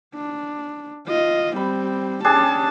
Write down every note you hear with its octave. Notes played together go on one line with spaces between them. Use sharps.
D4
F4 D#5
G3 C4 B5
C#4 D4 G4 G#4 A5